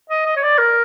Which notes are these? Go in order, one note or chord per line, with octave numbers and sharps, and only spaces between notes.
D#5
D#5
C#5
D5
A#4